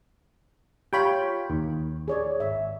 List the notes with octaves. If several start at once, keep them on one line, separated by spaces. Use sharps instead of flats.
F4 G4 C#5 G5 B5
D#2
G#4 C#5 D5
G#1 E5